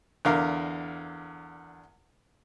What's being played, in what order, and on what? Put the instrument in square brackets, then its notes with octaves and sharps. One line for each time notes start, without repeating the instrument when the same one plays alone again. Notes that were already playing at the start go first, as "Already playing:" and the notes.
[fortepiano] E2 D3 A#4 F5